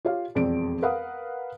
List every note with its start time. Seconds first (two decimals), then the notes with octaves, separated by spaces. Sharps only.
0.05 F4 G4 C#5 F5
0.35 E1 F2 C4 D5 D7
0.82 A#4 B4 F5 F#5 D#6